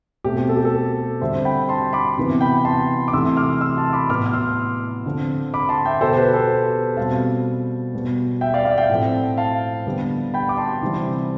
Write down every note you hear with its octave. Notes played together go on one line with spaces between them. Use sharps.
B2 A3 C4 G4
A4
G4
A4
D3 G3 C4 C5 E5
G5 B5
A5 C6
B5 D6
C3 E3 B3
G5 B5
A5 C6
D6
C3 E3 A3 C6 E6
D6 F6
C6 E6
A5 C6
B5 D6
A2 F3 B3 D6 F6
F6
C6 E6
D3 F3 C4
B5 D6
A5 C6
E5 G5
B2 B3 A4 C5
G4 B4
A4 C5
B2 G3 C4 F5 A5
B2 G3 B3
E5 G5
D5 F5
D5 F5
E5 G5
A2 F3 A3 C4
F5 A5
D3 G3 B3
G5 B5
D6
A5 C6
C3 E3 G3 C4